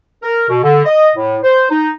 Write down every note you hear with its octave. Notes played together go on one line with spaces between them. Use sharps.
A#4
B2
D3
D#5
A2
C5
D#4